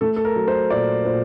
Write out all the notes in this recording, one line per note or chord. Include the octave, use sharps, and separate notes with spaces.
A3 A4
A4
A#4
F#3
C5
A#2 D5
A#2 C5